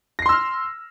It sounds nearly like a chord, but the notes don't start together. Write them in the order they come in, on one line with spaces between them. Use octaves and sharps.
A#6 C7 C6 E6 F6